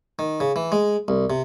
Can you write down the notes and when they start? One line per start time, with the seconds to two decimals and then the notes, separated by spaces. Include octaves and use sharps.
0.19 D#3
0.40 C#3
0.56 E3
0.72 G#3
1.08 C2
1.30 C3